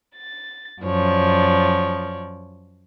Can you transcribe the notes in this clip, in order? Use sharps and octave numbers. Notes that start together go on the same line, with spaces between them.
A6
F#2 F3 C#5 D5